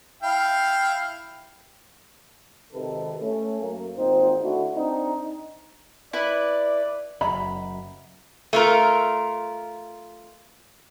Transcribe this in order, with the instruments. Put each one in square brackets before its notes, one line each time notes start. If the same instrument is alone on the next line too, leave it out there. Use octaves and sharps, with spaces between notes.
[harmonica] E4 F5 G5
[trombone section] G#1 C3 D#3 A4 B4
A3 C#4
F#2 A#3
G#1 A#2 C4 D#4 C5
D3 A3 E4 F#4
C4 D4 D#4
[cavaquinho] E4 B4 [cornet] D5
[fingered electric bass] F#1 F#2 [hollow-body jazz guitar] D#5 E5 A#5 [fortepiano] B5
[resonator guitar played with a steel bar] A3 F4 A#4